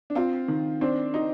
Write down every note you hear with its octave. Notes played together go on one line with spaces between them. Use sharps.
D4
C4 F4
D#3
C4 D4
D#4